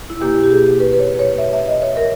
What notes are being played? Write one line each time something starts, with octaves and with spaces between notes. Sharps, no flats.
E4
E2 B2 A#3 G4
G4
G#4
B4
B4
C#5
C#5
E5
E5
D#5
C#5
A#4